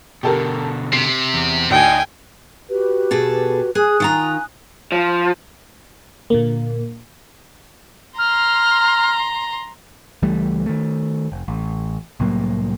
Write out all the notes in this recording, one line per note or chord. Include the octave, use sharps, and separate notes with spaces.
B2 D3 G4 A4 A#4
C3 C7
E2
D2 D4 D#4 G5 G#5
F#4 G4 B4
B2 G#4 A4
G#4 G#5 D#6 F#6
D#3 F4 A#5
F3
A#2 D3 A#3
A#5 C6 F6
C#2 E3 G3 A3
D#3 A3
F1
A1
C2 A2 F#3 A#3